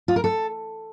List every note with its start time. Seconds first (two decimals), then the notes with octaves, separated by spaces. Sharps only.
0.08 F4
0.16 A#4
0.24 A4